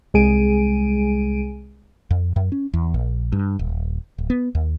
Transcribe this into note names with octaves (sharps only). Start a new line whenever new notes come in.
C2 G#3 G#4 G#5 D7 D#7
F2
F#2
C#4
E2
A#1
G2
D#1
D1
B3
D#2